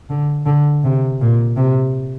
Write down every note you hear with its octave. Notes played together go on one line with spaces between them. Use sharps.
D3
D3
C3
A#2
C3